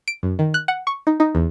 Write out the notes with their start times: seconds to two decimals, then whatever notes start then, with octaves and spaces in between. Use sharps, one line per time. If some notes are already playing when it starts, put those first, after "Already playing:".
0.08 D7
0.23 F#2
0.39 D#3
0.54 F#6
0.68 F#5
0.87 C#6
1.07 D#4
1.20 D#4
1.35 E2